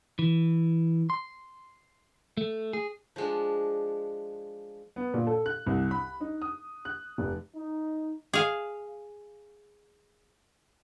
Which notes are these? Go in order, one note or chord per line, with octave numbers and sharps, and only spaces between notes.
E3
C6
A3
G#4
F3 G#3 D4
B3
A#2
A4
F#6
C2
B5
D#4
D#6
F#6
F1
D#4
G#4 F5